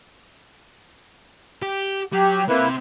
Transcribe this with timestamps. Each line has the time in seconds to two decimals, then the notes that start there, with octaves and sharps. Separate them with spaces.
1.62 G4
2.13 F#3 G4
2.49 C3 A#3 E4 B4